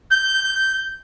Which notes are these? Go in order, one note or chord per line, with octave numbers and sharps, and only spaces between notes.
G6